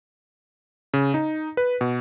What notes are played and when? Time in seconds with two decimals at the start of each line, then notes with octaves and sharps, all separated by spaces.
0.94 C#3
1.14 D#4
1.57 B4
1.81 B2